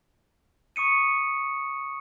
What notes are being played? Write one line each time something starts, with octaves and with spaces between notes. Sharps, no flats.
C#6 D#6 C#7 D#7